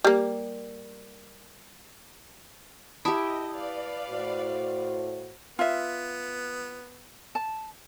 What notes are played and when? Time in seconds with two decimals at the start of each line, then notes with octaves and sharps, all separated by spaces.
0.04 G3 A#3
3.05 E4 G4 D#5 A5 B5 D#6
3.54 B4 D5 F5
4.09 A2 F#4 C5
5.59 B3 F4 E5
7.35 A5